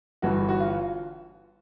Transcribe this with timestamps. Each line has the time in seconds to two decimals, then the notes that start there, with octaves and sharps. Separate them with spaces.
0.22 G1 G2 E3 F#4
0.49 F#4
0.60 F4